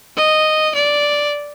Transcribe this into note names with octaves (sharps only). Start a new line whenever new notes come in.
D#5
D5